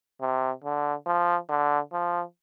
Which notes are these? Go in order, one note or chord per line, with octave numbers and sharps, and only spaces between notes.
C3
D3
F3
D3
F3